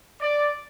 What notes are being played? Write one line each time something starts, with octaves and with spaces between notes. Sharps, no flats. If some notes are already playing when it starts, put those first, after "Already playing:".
D5